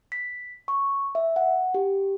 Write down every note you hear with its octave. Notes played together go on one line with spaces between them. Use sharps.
B6
C#6
E5
F#5
G4